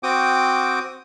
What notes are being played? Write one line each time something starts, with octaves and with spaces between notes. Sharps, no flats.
C4 F#4 G5 D6 D#6